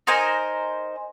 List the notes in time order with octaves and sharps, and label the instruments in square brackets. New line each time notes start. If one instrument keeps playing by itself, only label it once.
[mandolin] D#4 A#4 C5 G#5